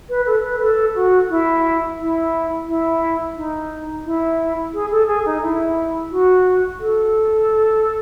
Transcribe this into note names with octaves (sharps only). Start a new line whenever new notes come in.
B4
A4
B4
A4
F#4
E4
E4
E4
D#4
E4
G#4
A4
G#4
D#4
E4
F#4
A4